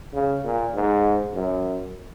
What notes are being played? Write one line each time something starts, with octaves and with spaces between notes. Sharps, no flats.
C#3
A#2
G#2
F#2